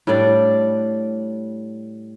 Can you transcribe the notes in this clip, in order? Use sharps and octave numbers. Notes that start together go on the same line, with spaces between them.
A2 G3 D4 D5